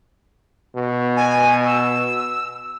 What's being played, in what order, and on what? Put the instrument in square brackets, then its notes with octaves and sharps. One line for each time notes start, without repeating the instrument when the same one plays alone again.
[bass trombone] B2
[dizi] G#5
E6